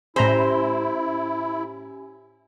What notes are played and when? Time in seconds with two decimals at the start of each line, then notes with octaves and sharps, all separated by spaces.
0.16 A2 C#4 E4 G4 C5 G#5 A#5 B5